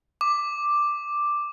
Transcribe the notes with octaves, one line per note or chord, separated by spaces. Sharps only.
D6